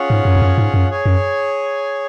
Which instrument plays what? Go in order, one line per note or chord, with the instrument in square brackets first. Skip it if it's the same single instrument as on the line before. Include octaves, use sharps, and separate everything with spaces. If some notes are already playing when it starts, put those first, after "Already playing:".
Already playing: [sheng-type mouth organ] C#4 F4 G#4 C#5 F#5
[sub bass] G#2
F#2
F2
F#2
G#2
F#2
[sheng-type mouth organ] G#4 C#5 G#5
[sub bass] F#2